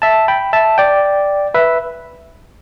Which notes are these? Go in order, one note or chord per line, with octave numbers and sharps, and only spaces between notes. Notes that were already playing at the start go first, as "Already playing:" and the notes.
E5 A5
G5 B5
E5 A5
D5 G5
B4 E5